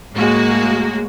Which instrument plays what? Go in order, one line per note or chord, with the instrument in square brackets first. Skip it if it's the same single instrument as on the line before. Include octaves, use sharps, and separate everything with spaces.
[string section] A2 G#3 A#3 F#4